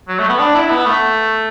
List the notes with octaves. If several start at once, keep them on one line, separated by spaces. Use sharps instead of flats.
F#3
A3
B3
D4
E4
B3
A3